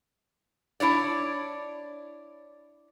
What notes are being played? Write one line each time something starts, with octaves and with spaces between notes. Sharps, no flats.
D4 E4 C#5 D5